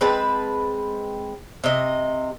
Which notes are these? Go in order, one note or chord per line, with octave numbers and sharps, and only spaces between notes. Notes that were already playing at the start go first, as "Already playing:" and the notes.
G#3 C4 B4 A5
C3 D#5